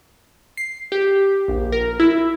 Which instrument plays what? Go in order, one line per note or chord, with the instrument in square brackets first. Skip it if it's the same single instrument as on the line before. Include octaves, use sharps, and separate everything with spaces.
[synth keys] C7
G4
A#1
A#4
E4